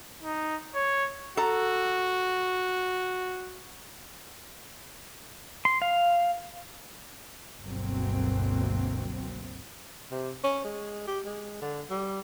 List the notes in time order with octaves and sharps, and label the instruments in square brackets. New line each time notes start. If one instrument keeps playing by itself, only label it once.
[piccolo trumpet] D#4
C#5
[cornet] F#4 [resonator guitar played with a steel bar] A4 A#5
[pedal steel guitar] C6
F5
[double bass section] G1 C#2 B2 F#3 A#3 C4
[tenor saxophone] C3
C#4
G#3
G4
G#3
D3
G3